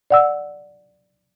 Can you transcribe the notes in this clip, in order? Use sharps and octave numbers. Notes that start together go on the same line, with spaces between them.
D5 F#5 E6